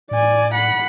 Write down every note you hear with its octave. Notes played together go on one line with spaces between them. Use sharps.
A2 D5 G#5
F#5 B5